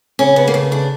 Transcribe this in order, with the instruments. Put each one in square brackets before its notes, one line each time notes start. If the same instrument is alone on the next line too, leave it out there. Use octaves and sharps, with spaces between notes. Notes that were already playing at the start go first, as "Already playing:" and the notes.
[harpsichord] C#3 [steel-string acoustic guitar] C#4
[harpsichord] C#3 [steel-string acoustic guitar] B3
[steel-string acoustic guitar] A#3
[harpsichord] C#3 [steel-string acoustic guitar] A3
[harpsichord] C#3 [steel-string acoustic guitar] D4